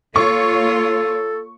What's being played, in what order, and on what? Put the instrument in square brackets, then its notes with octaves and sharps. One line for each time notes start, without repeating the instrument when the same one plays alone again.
[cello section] A#3 F4 C#5 [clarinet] A4 [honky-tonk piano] C#6